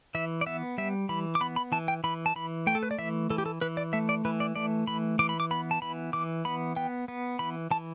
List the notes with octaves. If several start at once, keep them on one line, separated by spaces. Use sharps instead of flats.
E3 E5
D5
B3 E5
G3 E5
E3 B5
D6
B3 B5
B5
E3 A5
G5
E3 B5
A5
E3 B5
A3 G5
A4
B4
D5
E3 E5
E3 A4
G4
A4
E3 B4
D5
A3 E5
D5
E3 B4
D5
A3 D5
E3 B5
E3 D6
B5
D6
B3 B5
A5
E3 B5
E3 D6
B3 B5
B3 G5
B3
E3 B5
E3 A5